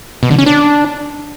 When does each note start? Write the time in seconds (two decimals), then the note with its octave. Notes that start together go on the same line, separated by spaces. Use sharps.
0.23 B2
0.31 D3
0.39 C#4
0.46 D4